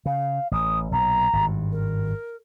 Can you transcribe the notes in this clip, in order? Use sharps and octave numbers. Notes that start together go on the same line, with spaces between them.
C#3 F5
A1 D#6
B1 A#2 A#5
G#1 G2
A#4